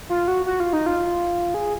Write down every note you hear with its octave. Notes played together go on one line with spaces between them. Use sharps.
F4
F#4
F#4
F4
D#4
F4
G#4